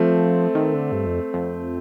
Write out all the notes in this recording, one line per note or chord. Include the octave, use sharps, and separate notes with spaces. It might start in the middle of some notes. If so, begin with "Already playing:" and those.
Already playing: F3 A3 C4
D#3
D3
G2
F2
F2